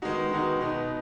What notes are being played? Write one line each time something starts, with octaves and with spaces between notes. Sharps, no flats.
D#3 G#3 B3 D#4 F#4
D#3 G#3 B3 D#4 F#4
B2 B3 D#4